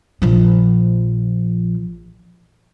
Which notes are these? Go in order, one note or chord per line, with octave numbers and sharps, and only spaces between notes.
A#1 F3